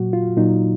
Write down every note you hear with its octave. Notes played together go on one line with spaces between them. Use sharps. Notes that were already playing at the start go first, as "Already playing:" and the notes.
Already playing: A#2 F#3 F#4
F4
A#2 F#3 D#4